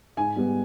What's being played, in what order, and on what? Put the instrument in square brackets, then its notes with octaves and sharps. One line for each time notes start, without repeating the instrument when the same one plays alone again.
[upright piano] G#2 G#5
G3 B3